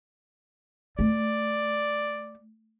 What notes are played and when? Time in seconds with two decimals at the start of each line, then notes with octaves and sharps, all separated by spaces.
0.99 A3 D5